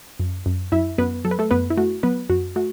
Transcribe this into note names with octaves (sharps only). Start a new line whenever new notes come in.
F#2
F#2
F#2 E4 E5
F#2 B3 B4
F#3 A4
B4
A3 A4
F#2 B3 B4
E4
A3 F#4
F#3 B3 B4
F#2 F#4
A3 F#4